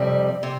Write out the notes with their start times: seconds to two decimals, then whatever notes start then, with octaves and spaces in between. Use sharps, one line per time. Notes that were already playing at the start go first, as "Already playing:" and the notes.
Already playing: F2 C3 G3
0.43 C3